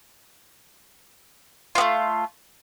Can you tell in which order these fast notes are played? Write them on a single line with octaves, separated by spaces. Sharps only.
F4 B3 A3